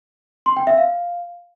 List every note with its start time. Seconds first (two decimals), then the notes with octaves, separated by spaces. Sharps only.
0.46 C6
0.57 G5
0.67 E5
0.78 F5